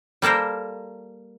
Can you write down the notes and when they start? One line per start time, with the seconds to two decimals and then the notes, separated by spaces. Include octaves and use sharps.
0.22 G3 A#3 A4 A#4 C5